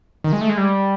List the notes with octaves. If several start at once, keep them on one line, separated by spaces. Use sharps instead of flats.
D#3
G#3
A3
G#3
G3